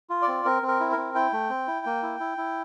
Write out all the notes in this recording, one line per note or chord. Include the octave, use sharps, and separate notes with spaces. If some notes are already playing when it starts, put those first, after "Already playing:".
F4
D5
C4
C4 A#4
C4
A#4
E4
A#4
C4
E4 G5
A3
C4
E4
A#3
E4
E4
E4